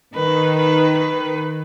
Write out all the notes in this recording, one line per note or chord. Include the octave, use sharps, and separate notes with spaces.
D#3 B4
B4
B4